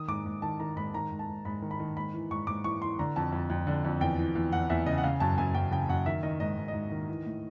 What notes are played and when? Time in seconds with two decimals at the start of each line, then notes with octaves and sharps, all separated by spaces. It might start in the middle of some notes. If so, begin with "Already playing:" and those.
Already playing: D#3 D#6
0.08 G#2 D6
0.26 G#2
0.42 D#3 A5
0.60 D#3 A#5
0.76 G#2 B5
0.94 D#3 A#5
1.11 G#2
1.19 A5
1.29 G#2
1.45 G#2 B5
1.62 D#3
1.71 B5
1.80 D#3
1.96 G#2 B5
2.13 E3
2.31 G#2 C#6
2.47 G#2 D6
2.64 E3 C#6
2.82 E3 C6
2.99 D3 A#5
3.16 F2 A5
3.32 F2
3.50 F2
3.67 D3
3.85 F2
4.01 E2 G5
4.18 E3
4.35 E2
4.52 E2 F#5
4.70 E2 E5
4.86 C#3 D#5
4.98 F#5
5.04 C#3 F5
5.20 F#2 A5
5.38 F#2 G#5
5.54 F#2 G5
5.71 C#3 G5
5.89 F#2 F#5
6.06 D#3 E5
6.23 D#3 D#5
6.40 G#2 D#5
6.57 G#2
6.68 D#5
6.74 G#2
6.91 D#3
7.09 E3
7.26 A2